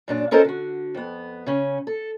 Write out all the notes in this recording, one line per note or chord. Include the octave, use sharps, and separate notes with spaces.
F#2 A#2 D4
C#4 F4 A4 A#4 C5 D#5
D3 F#4
F2 B3
C#3 C#4
A4